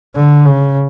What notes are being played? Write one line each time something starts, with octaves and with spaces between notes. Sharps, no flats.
D3
C#3